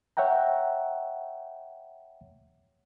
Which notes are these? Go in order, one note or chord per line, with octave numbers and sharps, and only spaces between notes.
C#5 E5 F#5 G5 A#5